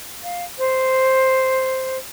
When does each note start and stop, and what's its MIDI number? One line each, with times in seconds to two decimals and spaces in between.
0.23 0.44 77
0.58 1.97 72